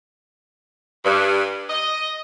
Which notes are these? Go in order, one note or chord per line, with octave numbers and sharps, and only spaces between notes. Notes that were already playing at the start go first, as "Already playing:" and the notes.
G2
D#5